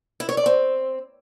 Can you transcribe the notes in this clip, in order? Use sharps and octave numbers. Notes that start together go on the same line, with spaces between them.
E4
C#5
D5
C4